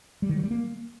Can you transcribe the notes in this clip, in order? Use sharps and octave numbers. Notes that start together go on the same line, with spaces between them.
G3
D#3
F#3
G3
A#3